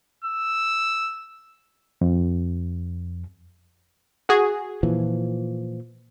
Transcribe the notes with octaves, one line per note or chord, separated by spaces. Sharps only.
E6
F2
F#4 G#4
A#2 E3 F3